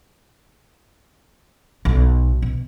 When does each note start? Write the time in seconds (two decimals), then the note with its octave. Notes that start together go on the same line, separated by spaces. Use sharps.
1.85 B1
2.42 B2